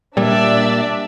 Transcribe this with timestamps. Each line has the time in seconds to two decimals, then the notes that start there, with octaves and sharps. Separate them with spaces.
0.17 A#2 G3 D4 D5 E5